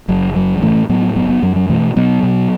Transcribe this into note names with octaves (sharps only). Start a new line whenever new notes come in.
F#1 F#3
F#2 F#3
F#3
A2 E3 A3
A2 F#3 B3
F#1 F#3 B3
F#3 B3
F#2 F#3
F#3
B2 E3 A3
B2 F#3 B3
B2